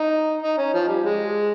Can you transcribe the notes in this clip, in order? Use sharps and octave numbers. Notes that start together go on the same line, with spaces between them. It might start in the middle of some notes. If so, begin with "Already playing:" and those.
Already playing: D#4
D#4
C#4
F3
G3
G#3